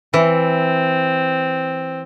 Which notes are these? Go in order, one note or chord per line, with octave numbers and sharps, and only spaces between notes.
E3 C4